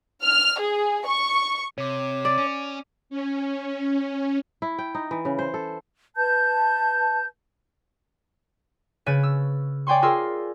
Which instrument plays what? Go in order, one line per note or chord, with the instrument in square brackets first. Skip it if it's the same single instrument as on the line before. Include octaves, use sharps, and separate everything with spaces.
[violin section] F6
G#4
C#6
[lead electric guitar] C3 [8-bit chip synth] C#5 D6
[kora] D5
[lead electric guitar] C#4
[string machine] C#4
[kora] E4
G5
D#4
E3
C#3
C5
A4
[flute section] B4 A5 G6
[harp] C#3 B4 C#5 A6 D7 D#7
E6
C#5 D5 G5 G#5 C6 C#6
F4 G#4 A#4 C6 E6